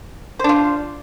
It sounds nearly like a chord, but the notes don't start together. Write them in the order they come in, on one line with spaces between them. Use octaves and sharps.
C5 D4 F4